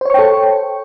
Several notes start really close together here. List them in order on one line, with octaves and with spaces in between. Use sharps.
C5 C#5 C#6 G5 A4